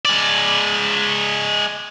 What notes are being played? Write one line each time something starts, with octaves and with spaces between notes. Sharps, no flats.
G#3 D5